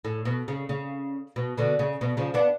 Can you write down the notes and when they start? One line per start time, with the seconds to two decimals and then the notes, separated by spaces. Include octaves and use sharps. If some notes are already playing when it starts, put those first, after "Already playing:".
0.05 A2
0.25 B2
0.48 C#3
0.69 C#3
1.36 B2
1.57 B2 D3
1.79 C#3
2.01 B2
2.17 C#3 F3
2.34 B3 D4